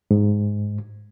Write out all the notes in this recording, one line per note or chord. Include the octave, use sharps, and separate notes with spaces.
G#2